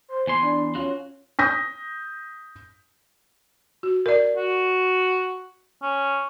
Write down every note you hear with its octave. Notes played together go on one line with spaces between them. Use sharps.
C5
E2 G#5 C6
D4
C#4 F4 F#4
D#6 G6 A#6 B6
F#4
A#4 D5
F#4
C#4